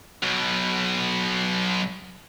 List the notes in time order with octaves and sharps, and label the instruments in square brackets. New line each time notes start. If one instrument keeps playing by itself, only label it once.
[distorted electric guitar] B1 B2